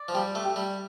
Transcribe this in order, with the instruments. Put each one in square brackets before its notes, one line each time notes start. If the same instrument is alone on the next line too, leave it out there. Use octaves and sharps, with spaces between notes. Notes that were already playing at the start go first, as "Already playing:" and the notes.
Already playing: [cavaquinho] D5
[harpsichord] F3
[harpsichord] G3 [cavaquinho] G4
[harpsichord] A3
[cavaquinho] G4
[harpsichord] G3